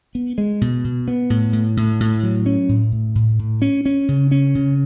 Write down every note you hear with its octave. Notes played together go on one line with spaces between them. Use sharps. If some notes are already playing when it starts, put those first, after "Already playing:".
B3
G#3
B2
B2
B3
A2
A2
A2
A2
F#3
C#4
A2
A2
A2
A2
C#4
C#4
C#3
C#4
C#3